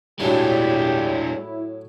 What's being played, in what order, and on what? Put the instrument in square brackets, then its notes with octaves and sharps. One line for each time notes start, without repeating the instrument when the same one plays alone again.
[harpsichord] A2 F#3 [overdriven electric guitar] G#3 D4 [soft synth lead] E4 [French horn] G4